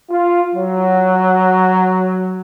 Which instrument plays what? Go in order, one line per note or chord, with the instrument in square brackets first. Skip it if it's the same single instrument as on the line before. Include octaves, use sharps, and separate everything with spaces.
[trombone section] F4
F#3